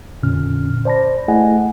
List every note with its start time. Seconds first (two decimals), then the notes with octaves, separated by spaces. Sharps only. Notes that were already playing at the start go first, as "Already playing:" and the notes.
0.22 F2 A#2 D3 C#4 F6
0.85 C5 D5 A5 B5 A#6
1.28 A3 E4 G#4 D#5 F#5 G#5